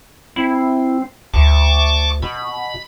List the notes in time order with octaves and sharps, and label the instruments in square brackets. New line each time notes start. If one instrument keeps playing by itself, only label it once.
[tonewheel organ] C4 [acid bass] E4
[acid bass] D2 [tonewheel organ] A5 C#6 D6
[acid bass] B2 [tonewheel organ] B5